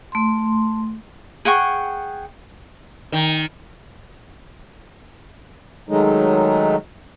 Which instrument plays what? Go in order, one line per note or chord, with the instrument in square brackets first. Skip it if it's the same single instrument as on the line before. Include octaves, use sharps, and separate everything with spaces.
[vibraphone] A3 C6
[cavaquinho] G#4 F#5 G5 C#6
[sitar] D#3
[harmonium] D#3 F#3 G#3 A3 D#4